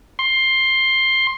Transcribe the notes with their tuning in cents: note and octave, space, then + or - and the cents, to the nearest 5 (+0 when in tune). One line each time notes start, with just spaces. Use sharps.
C6 +15